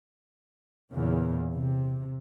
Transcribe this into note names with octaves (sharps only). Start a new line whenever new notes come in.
E2 A#2 C#3
C3